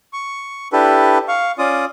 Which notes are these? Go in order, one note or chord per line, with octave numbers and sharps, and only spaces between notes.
C#6
D4 E4 G4 A4 B4
F5 C#6
C#4 F4 D5 D#6